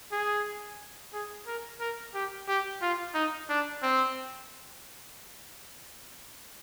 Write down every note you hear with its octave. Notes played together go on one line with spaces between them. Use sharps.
G#4
G#4
A#4
A#4
G4
G4
F4
D#4
D4
C4